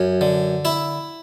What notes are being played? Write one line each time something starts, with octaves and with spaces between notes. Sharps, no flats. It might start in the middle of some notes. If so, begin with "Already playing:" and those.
Already playing: F#2 C#5
D3
E4 E5